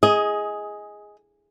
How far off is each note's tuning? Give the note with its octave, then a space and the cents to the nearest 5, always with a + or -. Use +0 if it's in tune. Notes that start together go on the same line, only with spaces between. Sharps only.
G#4 +0 D#5 +15